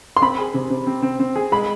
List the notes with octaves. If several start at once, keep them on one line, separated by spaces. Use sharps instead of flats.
C6
C4 B5
G#4
C3
C3
C4
C4
C4
G#4
G#3 B5